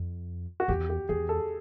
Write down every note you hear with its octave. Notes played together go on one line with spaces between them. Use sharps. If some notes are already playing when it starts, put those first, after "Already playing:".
Already playing: F2
F#4
E2 G4
G4
E2 G#4
A4